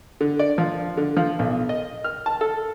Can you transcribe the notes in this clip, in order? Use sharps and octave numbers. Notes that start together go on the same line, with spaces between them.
D3
D5
F3
D3
F3
B1
D#5
F6
A5
A4